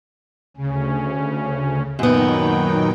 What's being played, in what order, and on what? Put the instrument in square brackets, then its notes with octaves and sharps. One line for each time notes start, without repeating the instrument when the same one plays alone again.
[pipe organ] D2 C#4 [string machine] C#3
[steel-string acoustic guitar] F#2 B3 [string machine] A#2 D#4 G5 [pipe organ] D#3 F#3